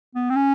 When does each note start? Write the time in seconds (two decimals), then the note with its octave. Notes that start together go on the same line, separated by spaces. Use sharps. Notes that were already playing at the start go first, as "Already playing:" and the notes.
0.15 B3
0.30 C4
0.36 C#4